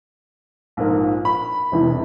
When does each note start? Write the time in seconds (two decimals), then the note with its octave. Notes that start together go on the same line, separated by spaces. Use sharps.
0.77 A#1 G#2 F3 A#3
1.25 B5
1.72 E1 E2 C3 E3